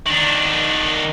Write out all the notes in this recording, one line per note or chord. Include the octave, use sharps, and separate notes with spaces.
D#3 D4